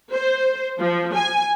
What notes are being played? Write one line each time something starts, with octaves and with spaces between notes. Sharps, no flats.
C5
F3
G#5